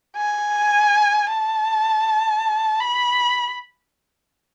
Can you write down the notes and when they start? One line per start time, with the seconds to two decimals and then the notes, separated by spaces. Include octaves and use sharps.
0.17 G#5
1.30 A5
2.80 B5